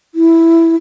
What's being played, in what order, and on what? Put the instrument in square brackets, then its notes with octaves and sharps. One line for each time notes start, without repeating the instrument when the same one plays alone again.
[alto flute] E4